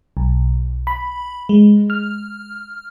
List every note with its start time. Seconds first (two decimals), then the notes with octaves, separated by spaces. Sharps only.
0.17 B1
0.87 B5
1.49 G#3
1.90 F6